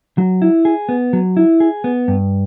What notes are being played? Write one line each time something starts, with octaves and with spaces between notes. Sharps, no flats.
F#3
E4
G#4
B3
F#3
E4
G#4
B3
G2